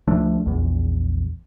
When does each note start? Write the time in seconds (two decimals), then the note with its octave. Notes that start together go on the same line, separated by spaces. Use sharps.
0.08 C#2 F3 A3 D4
0.46 A#1 E2